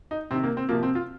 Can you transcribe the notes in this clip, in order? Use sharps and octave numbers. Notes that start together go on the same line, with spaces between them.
D#4
C3 D#3 C4
A#3
C4
C3 F3 A#3
C4
F4